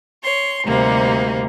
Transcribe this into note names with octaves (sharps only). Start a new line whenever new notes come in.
C#5 C6
D2 C3 G3 A#3 D#4